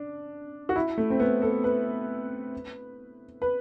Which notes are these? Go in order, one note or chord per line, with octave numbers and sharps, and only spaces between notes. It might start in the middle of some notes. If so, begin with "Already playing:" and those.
Already playing: D4
F#4
E4
A3
C4
B3
A4
B4
B4